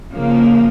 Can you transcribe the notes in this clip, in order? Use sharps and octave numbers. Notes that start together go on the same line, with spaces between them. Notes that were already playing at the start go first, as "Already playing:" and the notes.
C#3 F3 A#3